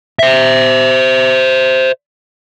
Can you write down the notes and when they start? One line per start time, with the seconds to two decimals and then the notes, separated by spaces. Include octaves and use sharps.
0.19 C5 E5